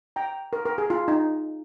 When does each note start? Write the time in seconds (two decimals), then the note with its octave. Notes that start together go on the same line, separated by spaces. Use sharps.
0.16 G5 A#5
0.53 A#4
0.65 A#4
0.78 G#4
0.90 F4
1.08 D#4